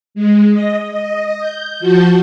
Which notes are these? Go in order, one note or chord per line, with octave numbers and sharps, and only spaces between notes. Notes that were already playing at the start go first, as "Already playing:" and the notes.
G#3
D#5
D#5
G6
F3 F#4 A5 G6